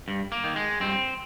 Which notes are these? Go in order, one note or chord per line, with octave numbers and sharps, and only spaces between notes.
G2
A#3
D#3
G#3
G2 C4